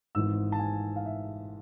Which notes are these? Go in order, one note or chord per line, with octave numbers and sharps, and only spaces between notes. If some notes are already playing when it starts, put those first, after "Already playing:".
G#1 G#2 E3 E6
A5
G#5
F5
E5